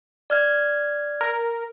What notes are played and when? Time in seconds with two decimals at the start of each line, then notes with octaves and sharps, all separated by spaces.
0.30 D5 F6 G#6
1.21 A#4